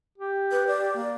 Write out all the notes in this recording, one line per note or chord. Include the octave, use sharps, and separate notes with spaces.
G4
B4
D5
A#3